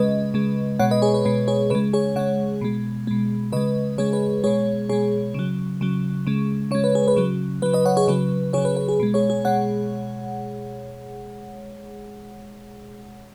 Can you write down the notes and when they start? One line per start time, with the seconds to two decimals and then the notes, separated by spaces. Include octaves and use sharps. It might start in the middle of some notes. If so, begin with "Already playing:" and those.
Already playing: C#3 G#3 B4 D#5
0.34 C#3 G#3
0.79 B2 G#3 C#5 F#5
0.91 B4 D#5
1.02 G#4 C#5
1.14 B4
1.25 B2 G#3 B4
1.48 G#4 C#5
1.70 C#3 G#3 B4
1.93 G#4 C#5
2.16 C#3 G#3 C#5 F#5
2.61 B2 G#3
3.07 B2 G#3
3.52 C#3 G#3 B4 D#5
3.98 C#3 G#3 G#4 C#5
4.13 B4
4.44 B2 G#3 G#4 C#5
4.89 B2 G#3 G#4 C#5
5.34 C#3 F#3
5.81 C#3 F#3
6.27 C#3 G#3
6.71 C#3 G#3 C#5
6.84 B4
6.95 G#4
7.08 B4
7.16 C#3 F#3
7.62 C#3 F#3 B4
7.74 B4 D#5
7.86 C#5 F#5
7.97 G#4 C#5
8.08 C#3 F#3 B4
8.53 C#3 F#3 G#4 C#5
8.65 B4
8.77 B4
8.88 G#4
9.00 B2 G#3
9.14 G#4 C#5
9.30 G#4
9.45 B2 G#3 C#5 F#5